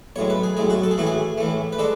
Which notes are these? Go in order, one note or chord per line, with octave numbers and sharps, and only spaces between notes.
B1 A2 G#3 C#5
B4
G#4
B1 A2 G#3 G#4
F#4
A4
G#4
A2 E3 A3 F#4
G#4
A2 E3 A3
B4
G#3 D4 A4